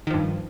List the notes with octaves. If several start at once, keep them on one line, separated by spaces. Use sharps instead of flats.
G2 D#3 F3